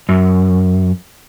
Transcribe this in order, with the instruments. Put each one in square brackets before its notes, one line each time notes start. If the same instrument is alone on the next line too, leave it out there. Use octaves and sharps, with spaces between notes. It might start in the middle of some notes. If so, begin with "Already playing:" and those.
[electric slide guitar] F#2